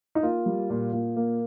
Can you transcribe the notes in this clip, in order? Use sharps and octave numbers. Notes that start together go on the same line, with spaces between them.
D#4
A#3 F4
G3
A#2
A#2
A#3